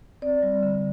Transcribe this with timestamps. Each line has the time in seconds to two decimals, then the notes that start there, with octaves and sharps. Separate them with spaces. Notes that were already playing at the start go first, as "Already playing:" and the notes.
0.22 C4 D5
0.42 G3
0.63 D3